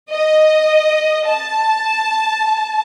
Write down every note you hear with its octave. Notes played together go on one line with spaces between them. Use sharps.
D#5
A5